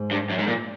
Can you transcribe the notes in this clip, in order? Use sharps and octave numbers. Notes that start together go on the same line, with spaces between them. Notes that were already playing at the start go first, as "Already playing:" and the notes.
Already playing: G#2
G2
F#2
G#2
A#2